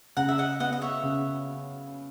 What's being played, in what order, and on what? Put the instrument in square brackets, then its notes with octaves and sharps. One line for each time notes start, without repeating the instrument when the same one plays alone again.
[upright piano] C#3 [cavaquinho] F#5 A#5
[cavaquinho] E5
D#5 F#5
[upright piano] B3 [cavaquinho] D#5 F#5
[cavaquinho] D#5
C#5 E5
[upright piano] C#3